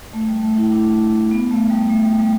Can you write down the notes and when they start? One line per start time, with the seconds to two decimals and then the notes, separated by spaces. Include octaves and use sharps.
0.13 A3
0.28 G3
0.43 A3
0.58 E4
0.72 D4
1.31 B3
1.51 A3
1.70 G3
1.89 A3
2.05 G3
2.19 G3